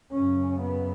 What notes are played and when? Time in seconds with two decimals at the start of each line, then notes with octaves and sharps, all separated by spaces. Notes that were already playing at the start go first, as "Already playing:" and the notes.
0.13 F#2 C#3 C#4
0.60 B3